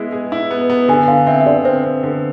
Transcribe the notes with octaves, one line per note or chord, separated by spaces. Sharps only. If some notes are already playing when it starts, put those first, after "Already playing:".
Already playing: G#3 B3 E4
G#4
E4
B3
B3
D3 G#5
D3 F5
C4 E5
E5
D3 D5
C4 C5
C4
D3